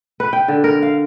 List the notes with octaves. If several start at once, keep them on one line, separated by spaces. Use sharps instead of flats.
B4
G5
D3
A#4
F5